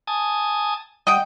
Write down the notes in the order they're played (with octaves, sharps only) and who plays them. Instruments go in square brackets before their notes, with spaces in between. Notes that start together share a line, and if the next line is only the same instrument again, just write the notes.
[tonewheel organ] G#5 A5 D#6
[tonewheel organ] G3 [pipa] D#5 F#5 G5